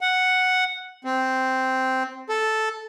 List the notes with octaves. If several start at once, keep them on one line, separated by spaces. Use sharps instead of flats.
F#5
C4
A4